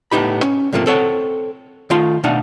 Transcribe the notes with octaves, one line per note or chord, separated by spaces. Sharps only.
A2 B3 D#4 G4 B5
C#4
G#2 C3 F3 A3 A#3
C4 A4 C#5 F#5
D#3 A3 F4 C6
B2 A3 D4 D#4 F5 F#5